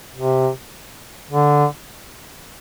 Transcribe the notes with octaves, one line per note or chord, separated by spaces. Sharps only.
C3
D3